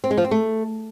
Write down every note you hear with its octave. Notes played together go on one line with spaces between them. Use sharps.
C4
G#3
F3
C4
A3